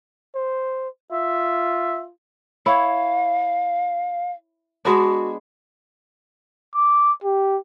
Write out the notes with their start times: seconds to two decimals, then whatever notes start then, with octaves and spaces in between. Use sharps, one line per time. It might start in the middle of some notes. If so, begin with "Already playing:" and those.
0.35 C5
1.12 F4 E5
2.66 E4 C#5 F5
4.85 G#3 B3 D4 F#4
6.75 D6
7.24 G4